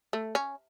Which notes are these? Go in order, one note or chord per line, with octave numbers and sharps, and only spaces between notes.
A3
C#4